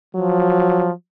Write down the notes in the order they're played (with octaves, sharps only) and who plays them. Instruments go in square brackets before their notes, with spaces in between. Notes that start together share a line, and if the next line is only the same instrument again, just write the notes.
[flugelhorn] F3 [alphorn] F#3